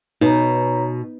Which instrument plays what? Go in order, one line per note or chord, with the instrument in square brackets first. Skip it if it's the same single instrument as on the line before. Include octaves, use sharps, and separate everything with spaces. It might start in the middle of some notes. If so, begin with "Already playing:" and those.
[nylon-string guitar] B2 [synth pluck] D#4 [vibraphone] C#5 A#5